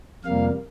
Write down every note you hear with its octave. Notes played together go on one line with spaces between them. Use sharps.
F2 C3 G3 A#3 F5